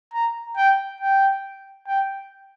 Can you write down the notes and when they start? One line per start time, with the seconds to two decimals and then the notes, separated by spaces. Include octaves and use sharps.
0.14 A#5
0.57 G5
1.01 G5
1.87 G5